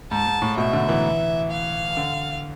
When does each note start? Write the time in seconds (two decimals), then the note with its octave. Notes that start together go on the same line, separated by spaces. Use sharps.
0.11 G#2 A5
0.27 G#2
0.42 A2
0.57 B2 E5
0.73 D3
0.89 E3
1.51 F5
1.97 D3